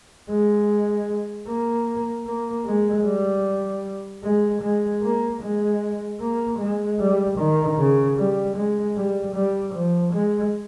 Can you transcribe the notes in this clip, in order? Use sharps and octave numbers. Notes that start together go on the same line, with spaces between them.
G#3
A#3
A#3
G#3
G3
G#3
G#3
A#3
G#3
A#3
G#3
G3
D#3
C#3
G3
G#3
G3
G3
F3
G#3